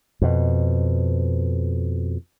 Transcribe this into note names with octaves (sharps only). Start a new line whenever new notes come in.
F2 B2